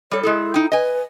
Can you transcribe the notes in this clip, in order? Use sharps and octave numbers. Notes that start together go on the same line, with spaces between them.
G3 A4 C#5
G#3 E4 G#4 A4
D#4 G5
B4 D#5 G#5